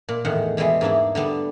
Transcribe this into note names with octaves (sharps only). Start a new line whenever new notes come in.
A#2
E2 A2 D#3 G#4 F#5
B2 E3 G3 G#3 B3
G#2 A#3 D4 E4
D3 G3 B3 D4